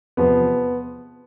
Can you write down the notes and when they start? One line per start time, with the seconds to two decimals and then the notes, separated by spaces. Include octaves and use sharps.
0.17 E2 C3 F3 B3